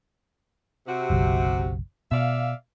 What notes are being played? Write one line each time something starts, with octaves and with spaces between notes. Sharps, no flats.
C3 F#4
F#1 B1
B2 D5 E5 F5